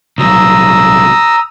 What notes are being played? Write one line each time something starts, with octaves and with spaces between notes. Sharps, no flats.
C2 F#3 A#5 D#6 E6